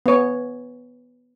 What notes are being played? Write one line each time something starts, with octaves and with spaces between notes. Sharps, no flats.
B3 C#5